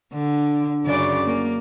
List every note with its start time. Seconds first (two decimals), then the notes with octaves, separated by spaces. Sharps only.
0.13 D3
0.85 F#2 C#3 D5
1.26 A#3